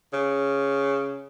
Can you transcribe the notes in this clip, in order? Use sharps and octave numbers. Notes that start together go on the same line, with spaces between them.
C#3